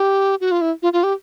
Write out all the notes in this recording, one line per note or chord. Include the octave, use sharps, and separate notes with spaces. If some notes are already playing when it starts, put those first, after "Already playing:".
Already playing: G4
F#4
F4
E4
F4
F4
G4